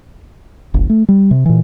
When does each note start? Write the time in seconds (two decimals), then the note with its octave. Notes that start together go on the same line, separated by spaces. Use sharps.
0.74 D1 G1
0.89 A3
1.09 G3
1.31 C3
1.46 A#2 E3